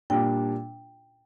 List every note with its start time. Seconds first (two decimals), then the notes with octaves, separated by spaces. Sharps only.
0.10 A#2 G3 D4 F4 G5